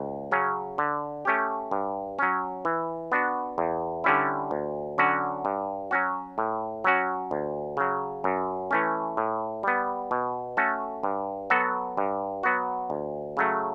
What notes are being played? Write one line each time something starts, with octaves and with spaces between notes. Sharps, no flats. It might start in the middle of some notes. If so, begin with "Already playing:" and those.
Already playing: C#2
C#3 F#3 C#4
D3
A3 C#4 G4
G2
F#3 C#4
E3
B3 D4 F#4
E2
D3 G3 C#4 E4
D2
D3 F#3 C#4 F#4
G2
F#3 C#4 F#4
A2
F#3 C#4 F#4
D2
C#3 F#3
F#2
E3 A3 C#4
A2
G3 B3
B2
A3 C#4 F#4 A4
G2
F#3 B3 F#4 A4
G2
F#3 B3 F#4
D2
C#3 F#3 A3